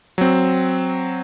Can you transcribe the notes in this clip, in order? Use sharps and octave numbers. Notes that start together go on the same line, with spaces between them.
F#3 C4